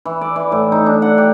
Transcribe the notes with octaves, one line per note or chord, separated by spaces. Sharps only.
E3
D5
E3
A2
D#4
D4
F#5
G4